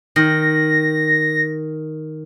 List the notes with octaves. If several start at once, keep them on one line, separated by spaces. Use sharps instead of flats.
D#3 A#6